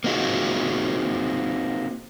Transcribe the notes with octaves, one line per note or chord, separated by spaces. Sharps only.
A#3 C4 D#4 F4 F#4 G#4